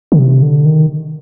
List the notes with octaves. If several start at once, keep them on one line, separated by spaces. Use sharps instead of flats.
D3
C3
D3
D#3